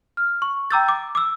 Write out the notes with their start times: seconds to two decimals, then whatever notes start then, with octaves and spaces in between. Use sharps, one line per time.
0.17 F6
0.42 C#6
0.70 G5 A#5 D6 E6 G6 A6
0.88 D6
1.15 D6 E6